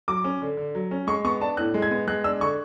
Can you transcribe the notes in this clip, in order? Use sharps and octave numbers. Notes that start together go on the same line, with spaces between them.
F#3 D6
C#4
D3
D3
F#3
C#4
G#3 C#6
B3 C#6
D4 A5
A2 F#6
G#3
G#6
B3
G#3 F#6
D4 E6
D3 C#6